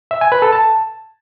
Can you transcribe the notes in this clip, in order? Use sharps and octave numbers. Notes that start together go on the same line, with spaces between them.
E5
G#5
B4
A4
A5